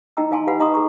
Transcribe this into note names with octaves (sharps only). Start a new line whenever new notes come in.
D#4 E4 D#5 G5 A#5 E6
D#4 E4 F5 G#5 A5 C6
F4 G4 B4 F5 F#5 B5
D#4 D#5 A#5 C6 C#6 D#6
G#4 A#5 C#6